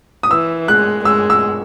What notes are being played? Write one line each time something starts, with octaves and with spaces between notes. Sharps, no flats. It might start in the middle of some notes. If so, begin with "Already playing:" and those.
D#6
E3 E6
G#3 F#6
G#3 E6
E6